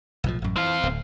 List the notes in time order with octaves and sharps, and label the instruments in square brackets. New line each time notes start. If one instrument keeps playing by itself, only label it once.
[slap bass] B1 A2 F3
A1 F#2
[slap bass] E3 [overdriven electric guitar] C4 F5
[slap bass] D1